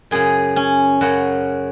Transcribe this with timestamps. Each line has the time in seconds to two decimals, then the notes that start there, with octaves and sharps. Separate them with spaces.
0.11 F#2 C#3 G#4
0.56 C#4
1.01 F#2 C#3 F#4